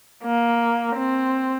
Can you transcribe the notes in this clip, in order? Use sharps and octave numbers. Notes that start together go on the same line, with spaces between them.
A#3
C4